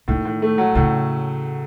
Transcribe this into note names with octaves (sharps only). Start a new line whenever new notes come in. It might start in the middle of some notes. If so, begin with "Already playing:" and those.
A2 D#3
A2
A3
F#3
A2 C#3